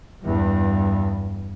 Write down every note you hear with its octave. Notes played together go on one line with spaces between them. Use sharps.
E2 G2